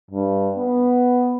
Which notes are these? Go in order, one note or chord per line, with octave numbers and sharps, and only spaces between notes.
G2
B3